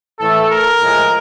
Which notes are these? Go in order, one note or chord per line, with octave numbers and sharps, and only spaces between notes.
A2 E3 A3 A4
A#4
A2 F3 G#3